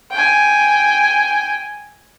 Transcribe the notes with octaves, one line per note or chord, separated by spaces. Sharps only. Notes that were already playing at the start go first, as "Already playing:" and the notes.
G5 G#5